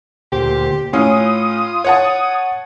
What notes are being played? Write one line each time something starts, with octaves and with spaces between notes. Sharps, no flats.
D2 A#2 G4 C5
A2 C#4 F4 D#6
C#5 F#5 A5